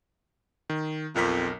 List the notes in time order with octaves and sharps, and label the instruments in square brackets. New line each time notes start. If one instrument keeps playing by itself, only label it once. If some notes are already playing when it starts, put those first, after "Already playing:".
[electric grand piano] D#3
[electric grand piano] B1 A#4 B6 [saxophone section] F2